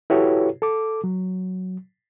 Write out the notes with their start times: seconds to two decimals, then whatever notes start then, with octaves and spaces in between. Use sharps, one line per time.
0.10 E4 F#4 G4 A4 B4 C#5
0.62 A4 D6
1.04 F#3